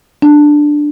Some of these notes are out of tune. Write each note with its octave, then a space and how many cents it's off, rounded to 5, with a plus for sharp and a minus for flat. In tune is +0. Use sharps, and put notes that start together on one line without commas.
D4 +5